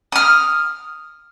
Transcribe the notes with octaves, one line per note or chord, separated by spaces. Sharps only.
D#6 F6